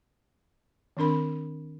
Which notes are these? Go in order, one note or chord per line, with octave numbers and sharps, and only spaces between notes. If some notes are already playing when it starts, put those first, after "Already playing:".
D#3 C4 D4 A#4 B5